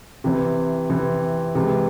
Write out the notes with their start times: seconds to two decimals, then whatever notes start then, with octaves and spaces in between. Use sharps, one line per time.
0.24 C3 E3 C4
0.90 C3 E3 C4
1.55 C3 E3 G#3